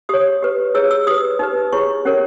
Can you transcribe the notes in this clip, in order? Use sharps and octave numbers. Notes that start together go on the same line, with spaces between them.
G4 C#5 D#6
G4 B4
E4 G#4 C#5 E6
E6
G4 B4 D#6
D#4 G4 B4
E4 G#4 C#5 C#6
C#4 G4 A#4 C#5